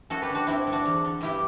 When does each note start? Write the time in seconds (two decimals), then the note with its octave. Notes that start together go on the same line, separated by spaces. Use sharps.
0.10 F#2 F#4 A4
0.22 G4 B4
0.29 D3
0.35 D4 F#4
0.47 G2 C4 E4
0.67 D3
0.72 D4 F#4
0.85 E2
1.05 D3
1.21 G2 E4 G4